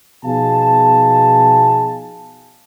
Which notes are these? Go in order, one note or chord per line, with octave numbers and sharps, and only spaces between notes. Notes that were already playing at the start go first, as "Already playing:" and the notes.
B2 F3 D#4 G#4 F5 A5